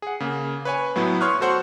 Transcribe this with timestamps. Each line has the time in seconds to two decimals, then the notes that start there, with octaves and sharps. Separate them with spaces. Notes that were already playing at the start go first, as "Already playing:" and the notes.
0.02 G#4 F#5
0.20 C#3 A#3
0.65 B4 C#5 G#5
0.96 A2 F#3 B3 E4
1.21 C#5 C6 C#6 D#6 F6 F#6
1.40 F#4 A4 C5 F#5 C#6